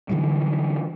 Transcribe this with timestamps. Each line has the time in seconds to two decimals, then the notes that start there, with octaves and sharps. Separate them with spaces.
0.09 D3 E3 F#3 G3